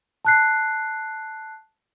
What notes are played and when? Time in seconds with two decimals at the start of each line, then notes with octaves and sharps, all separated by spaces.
0.25 A5 F#6 C7